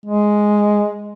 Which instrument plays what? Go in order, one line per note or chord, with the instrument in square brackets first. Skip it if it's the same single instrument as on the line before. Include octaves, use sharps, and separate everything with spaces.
[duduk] G#3